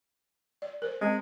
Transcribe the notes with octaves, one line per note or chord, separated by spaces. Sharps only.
D5
A#4 C5
G#3 C4